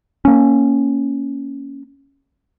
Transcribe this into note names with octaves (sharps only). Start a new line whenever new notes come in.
A#3 C#4